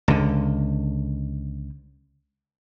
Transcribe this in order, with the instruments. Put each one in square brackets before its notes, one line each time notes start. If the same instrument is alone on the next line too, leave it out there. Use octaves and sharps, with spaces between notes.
[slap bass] C#2 D3